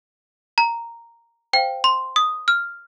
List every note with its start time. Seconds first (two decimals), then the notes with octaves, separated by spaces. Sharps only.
0.58 A#5
1.53 C5 F5 G5
1.84 C6
2.16 D#6
2.48 F6